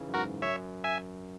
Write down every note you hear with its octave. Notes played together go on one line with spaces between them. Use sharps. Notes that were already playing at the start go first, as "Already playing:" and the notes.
Already playing: C#3 E3 D#4
F#2
G#2 F#4 A#4
F#2 C#5 E5
E5 G#5